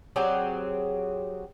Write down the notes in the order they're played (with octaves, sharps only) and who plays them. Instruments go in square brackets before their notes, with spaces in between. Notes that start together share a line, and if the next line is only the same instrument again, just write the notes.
[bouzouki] F#3 C4 G4 G#4